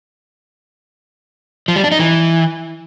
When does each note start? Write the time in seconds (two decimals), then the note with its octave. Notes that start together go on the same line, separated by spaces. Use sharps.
1.68 F3
1.76 G3
1.84 D4
1.92 D#4
1.99 E3